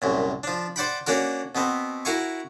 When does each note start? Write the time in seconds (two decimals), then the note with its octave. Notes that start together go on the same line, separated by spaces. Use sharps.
0.02 C2 F#2 A#2
0.43 F3 D4
0.76 C5 D5 F#5 G5 B5
1.07 A#3 C#4 D4 F#4 A#4
1.55 B2 B3 C4
2.05 E4 F#4 A#4 F5 G#5 C#6